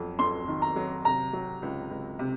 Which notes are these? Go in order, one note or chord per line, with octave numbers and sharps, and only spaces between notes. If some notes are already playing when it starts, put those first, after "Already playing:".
Already playing: F2 F#3
F2 C6
D#3
A#5
F#3
C3 A#5
F#3
C#2
C#2
C3